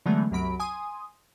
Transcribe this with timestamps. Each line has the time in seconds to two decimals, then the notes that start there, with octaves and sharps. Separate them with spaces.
0.06 D3 E3 F#3 G#3 A3 B3
0.31 C2 F#2 F#3 B5 D7
0.60 G#5 C6 D#6